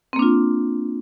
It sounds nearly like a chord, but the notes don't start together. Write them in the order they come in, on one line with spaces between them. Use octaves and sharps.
C4 A#3 D4 F4